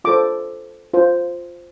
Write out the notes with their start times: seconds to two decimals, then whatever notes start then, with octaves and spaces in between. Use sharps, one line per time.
0.04 F4 A4 C5 D6
0.94 F4 C5